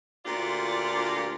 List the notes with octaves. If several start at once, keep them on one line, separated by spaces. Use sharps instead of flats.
D2 A#2 F4 G4 D5